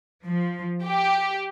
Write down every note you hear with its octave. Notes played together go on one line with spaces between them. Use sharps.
F3
G4